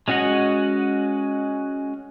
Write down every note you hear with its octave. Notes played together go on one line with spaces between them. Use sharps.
G#3 C#4 F#4 D#5 F#5